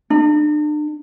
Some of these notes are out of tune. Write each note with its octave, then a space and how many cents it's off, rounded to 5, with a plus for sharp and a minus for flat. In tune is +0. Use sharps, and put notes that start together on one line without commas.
D4 +40